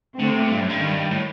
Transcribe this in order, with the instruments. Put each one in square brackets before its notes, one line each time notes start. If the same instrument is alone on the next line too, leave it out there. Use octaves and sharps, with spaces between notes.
[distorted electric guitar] D3 [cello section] A3 C4
[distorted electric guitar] C3
A#2
G2
F#2
G2
[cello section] D#3 G3
[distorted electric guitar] A2